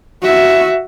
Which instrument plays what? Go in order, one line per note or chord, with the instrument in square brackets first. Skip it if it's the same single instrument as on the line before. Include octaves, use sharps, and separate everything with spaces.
[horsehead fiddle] F#4 E5